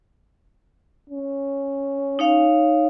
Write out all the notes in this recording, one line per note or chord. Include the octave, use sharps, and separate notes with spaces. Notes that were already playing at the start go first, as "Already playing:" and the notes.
C#4
D#4 C#5 F5